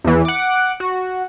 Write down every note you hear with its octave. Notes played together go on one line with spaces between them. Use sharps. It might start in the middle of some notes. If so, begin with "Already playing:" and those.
E2 E3
F#5 D6
F#4